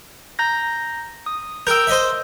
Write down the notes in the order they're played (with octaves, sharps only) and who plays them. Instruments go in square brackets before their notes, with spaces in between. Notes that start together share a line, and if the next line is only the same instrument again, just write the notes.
[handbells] A#5 G6 A#6
D#6
[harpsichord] A#4 G5 [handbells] E6 G6
[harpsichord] C5 D#5 E5